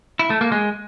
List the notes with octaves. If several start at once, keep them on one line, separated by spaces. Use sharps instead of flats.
E4
A3
A#3
G#3